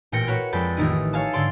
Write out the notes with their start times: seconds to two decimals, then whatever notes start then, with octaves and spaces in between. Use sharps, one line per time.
0.12 A1 A#2 G5 A#6 C#7 D7
0.27 F#4 A#4 B4 C#5
0.53 F2 G#3 A4 D5 B5 G6
0.77 A1 D#3 D#4 E4 D#5
1.13 C#5 F5 G#5 A5 E6
1.33 G#2 D3 A4 D5 C6